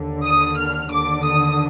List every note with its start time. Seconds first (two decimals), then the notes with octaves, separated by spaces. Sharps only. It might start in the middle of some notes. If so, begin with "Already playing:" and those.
Already playing: D#2 D3
0.24 D#6
0.58 F6
0.91 D#2 D3 D6
1.25 D#6